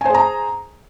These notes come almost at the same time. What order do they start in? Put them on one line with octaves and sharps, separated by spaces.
G#5 C5 G#4 A#5